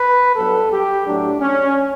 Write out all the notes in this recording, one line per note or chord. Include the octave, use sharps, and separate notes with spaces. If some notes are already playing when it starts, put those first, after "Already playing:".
Already playing: B4
G2 F#3 B3 A4
G4
A2 F#3 A3 D4
C#4